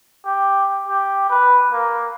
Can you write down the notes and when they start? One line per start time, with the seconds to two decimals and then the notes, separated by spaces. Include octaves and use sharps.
0.25 G4
0.87 G4
1.30 B4
1.72 A#3